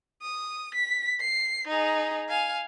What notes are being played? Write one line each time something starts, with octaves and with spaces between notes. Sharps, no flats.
D#6
B6
C7
D#4 G#4
F5 G#5